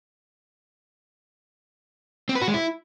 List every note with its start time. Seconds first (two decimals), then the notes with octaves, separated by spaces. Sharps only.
2.29 C4
2.35 B4
2.41 F#4
2.48 G#3
2.54 E4